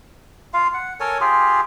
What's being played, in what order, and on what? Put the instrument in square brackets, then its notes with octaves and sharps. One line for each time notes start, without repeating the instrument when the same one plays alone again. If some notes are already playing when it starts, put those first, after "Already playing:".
[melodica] F4 F5
F#5
A4 A#4 C#5 G#5
F4 G4 G#4